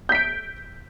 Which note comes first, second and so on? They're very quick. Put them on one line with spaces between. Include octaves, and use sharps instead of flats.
G6 B6 D7